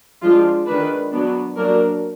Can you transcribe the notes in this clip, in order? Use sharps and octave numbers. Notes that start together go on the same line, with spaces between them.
F3 G#3 D4 F4
D#3 G#3 D4 B4
F#3 B3 D4
F#3 A#3 D4 A#4